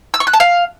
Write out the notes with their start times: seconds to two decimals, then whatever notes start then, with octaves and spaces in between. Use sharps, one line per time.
0.14 E6
0.20 C#6
0.27 F#6
0.33 A5
0.40 F5